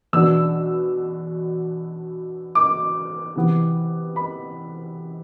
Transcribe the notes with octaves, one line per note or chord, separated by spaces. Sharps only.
E2 B2 B3 D4 E6
D6
C3 E3 B3
B5